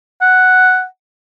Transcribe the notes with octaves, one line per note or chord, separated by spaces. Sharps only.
F#5